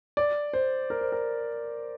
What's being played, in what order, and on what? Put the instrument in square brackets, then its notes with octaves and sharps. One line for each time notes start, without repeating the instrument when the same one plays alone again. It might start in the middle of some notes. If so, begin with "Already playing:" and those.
[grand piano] D5
C5
A#4
C5
A#4